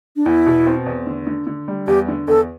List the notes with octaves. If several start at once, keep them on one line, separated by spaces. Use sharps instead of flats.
D4
E2 E4
B2
C4
E2
D3
D3
D3
G3
E2 G4
D3
E2 A4